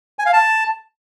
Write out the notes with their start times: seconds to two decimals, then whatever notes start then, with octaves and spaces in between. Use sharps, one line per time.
0.19 G#5
0.26 F5
0.33 A5